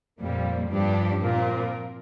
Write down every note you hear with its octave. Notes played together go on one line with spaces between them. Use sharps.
F2 A#2 G3 A#3
G2 F3 D4 G4
A#2 F3 C4 F4 A#4